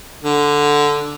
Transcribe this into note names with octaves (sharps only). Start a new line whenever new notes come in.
D3